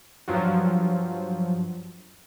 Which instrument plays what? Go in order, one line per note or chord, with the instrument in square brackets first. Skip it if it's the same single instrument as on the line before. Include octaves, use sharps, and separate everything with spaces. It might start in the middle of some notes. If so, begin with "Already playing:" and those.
[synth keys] G2 F3 F#3